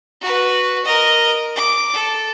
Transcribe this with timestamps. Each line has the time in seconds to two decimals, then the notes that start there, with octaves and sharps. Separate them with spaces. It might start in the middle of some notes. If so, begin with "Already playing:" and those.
0.21 F#4 B4
0.85 A#4 D#5
1.56 D6
1.93 A4